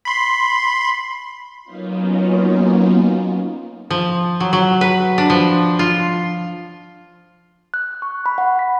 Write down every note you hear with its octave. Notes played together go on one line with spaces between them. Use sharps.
B5 C6
F#3 A#3 B3 C#4 D#4 F4
F3
F#3
F#3
B4
D4
F3
F4
F#6
C#6
B5
F#5
B6